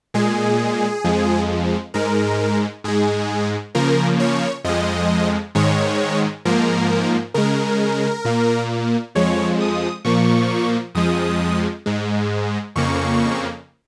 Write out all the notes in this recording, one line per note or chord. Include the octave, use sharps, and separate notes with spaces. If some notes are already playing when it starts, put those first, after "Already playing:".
A#2 G#3 G#4
F2 F3 G#3
G#2 G#3 A#4
G#2 G#3 G#4
C#3 F3 A#3 A#4
C#5
F2 F3 G#3 D#5
G#2 D#3 G#3 C#5
G#2 F3 A#3 A#4
C#3 G#3 A#4
A#2 A#3
F2 F3 G#3 C#5
D#6
A#2 F3 A#3 C#6
F2 F3 G#3 D#6
G#2 G#3
F2 C#3 A#3 C#6